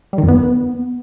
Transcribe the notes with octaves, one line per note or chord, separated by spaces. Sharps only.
G3
D#3
F2
B3